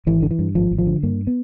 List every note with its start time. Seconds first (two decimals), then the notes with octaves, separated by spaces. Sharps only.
0.06 G#1 E3
0.22 D3
0.31 E3
0.39 G2
0.55 G#1 F3
0.71 G#1
0.78 F3
0.87 D3
1.03 G2 A#3
1.27 B3